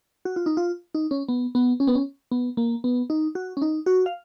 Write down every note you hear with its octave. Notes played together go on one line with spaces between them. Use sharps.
F#4
F4
D#4
F4
D#4
C#4
B3
B3
C#4
B3
C#4
B3
A#3
B3
D#4
F#4
C#4
D#4
F#4
F5